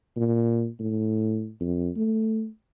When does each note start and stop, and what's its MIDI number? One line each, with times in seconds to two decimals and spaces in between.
0.17 0.67 46
0.79 1.50 45
1.60 1.89 41
1.96 2.48 57